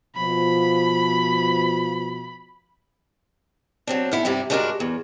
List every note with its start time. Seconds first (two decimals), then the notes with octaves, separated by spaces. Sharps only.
0.16 B2 F3 B5
3.87 F#3 C4 D4
4.11 B3 E4 A4 F5
4.25 G2 C3 G3 E4
4.50 G2 G#3 D4 F#4 G#4 A#4
4.80 E2